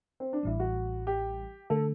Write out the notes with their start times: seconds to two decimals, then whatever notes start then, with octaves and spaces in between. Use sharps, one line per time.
0.20 C4
0.33 D4
0.43 A1 A2 E3 G3 E4
0.60 F#4
1.07 G4
1.70 D3 A3 A4